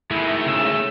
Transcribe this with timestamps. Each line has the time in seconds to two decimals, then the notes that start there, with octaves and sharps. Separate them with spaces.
0.11 D#3 G#3 A3 E4
0.46 C#3 E6